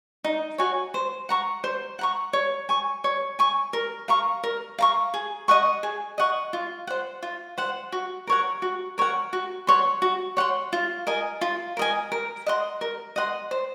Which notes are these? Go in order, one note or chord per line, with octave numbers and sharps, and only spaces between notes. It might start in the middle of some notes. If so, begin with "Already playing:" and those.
D#4
F#4 C#5 G#5
C5
F#5 A#5 C#6
C5
F#5 A#5 C#6
C#5
G#5 C#6
C#5
G#5 C#6
A#4
F5 A#5 C#6
A#4
F5 A#5 C#6
G#4
D#5 F#5 C#6
G#4
D#5 F#5 C#6
F4
C5 F#5
F4
C5 F#5
F#4
A#4 C#5 F#5
F#4
A#4 C#5 F#5
F#4
C#5 F#5 C6
F#4
C#5 F#5 C6
F4
A#4 D#5 G#5
F4
A#4 D#5 G#5
A#4
D#5 F#5 C6
A#4
D#5 F#5 C6
C5